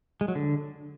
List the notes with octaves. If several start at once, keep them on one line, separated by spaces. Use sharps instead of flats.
G#3
F#3
D3